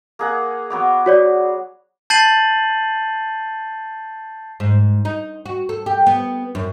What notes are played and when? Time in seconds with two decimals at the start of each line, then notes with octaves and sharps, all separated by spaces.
0.19 A#3 G#4 F#5
0.70 F#3 B3 D6
1.06 F#4 C#5 D5
2.10 A5 G6 A6 C7 D#7 F#7
4.60 G#2
5.05 D#4
5.46 F#4
5.69 A4
5.86 G4
6.07 B3
6.55 F#2